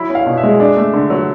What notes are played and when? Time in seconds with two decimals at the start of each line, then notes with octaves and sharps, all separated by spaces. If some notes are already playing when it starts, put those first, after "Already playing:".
Already playing: F#3 E4 B5
0.10 C#4
0.15 F5
0.26 B2
0.37 E5
0.43 G#3
0.60 D4
0.76 A3
0.93 D3
1.10 F#3